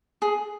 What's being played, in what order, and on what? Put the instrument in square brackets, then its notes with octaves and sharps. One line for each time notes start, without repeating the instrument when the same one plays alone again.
[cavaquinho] G#4